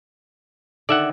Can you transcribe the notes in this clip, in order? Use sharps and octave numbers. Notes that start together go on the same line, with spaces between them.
D3 D#3 A4 D5 E5 F#5